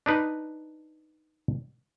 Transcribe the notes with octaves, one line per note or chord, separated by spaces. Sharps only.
D4 D#4 B4